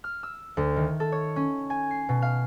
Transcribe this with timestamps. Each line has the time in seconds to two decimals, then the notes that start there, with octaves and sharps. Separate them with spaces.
0.04 F6
0.23 E6
0.57 D2
0.76 D#3
1.00 A4
1.12 C#5
1.36 C#4
1.70 G#5
1.91 C7
2.09 B2
2.22 F5